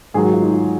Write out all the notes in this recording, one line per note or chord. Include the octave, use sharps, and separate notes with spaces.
G#2 D#3 F#3 G#4
F#4
F4
D#4
F4